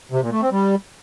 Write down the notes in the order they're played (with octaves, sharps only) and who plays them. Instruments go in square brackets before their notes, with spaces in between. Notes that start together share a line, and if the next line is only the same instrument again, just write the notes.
[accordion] C3
A#2
A3
C4
G3